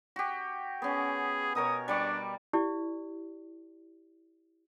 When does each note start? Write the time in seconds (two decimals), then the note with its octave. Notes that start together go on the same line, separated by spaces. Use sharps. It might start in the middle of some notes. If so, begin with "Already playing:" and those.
0.16 F#4 G4
0.82 B3 C#4 G#4
1.55 B2 A#4 C#5 D#6
1.88 G3 D4 D5 C#6
2.53 E4 G4 D5